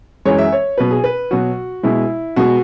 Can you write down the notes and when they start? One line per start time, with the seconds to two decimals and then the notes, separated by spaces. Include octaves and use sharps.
0.25 F#2 E3 G#3 C#5
0.38 E5
0.52 C#5
0.78 B2 F#3 B4
0.91 G#4
1.04 B4
1.31 B2 F#3 F#4
1.83 B2 G#3 E4
2.36 B2 G#3 F#4